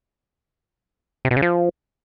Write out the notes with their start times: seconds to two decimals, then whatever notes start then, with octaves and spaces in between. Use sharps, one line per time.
1.25 C3
1.31 B2
1.36 C#3
1.42 F3